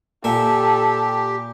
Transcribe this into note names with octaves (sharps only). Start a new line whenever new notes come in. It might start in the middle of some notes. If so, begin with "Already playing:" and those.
A#2 G4 A4 E5